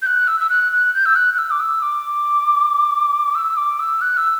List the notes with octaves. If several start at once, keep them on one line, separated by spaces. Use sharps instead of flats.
G6
F#6
E6
E6
F#6
F#6
G6
E6
F#6
F#6
E6
D6
E6
D6
E6
D6
E6
F#6
E6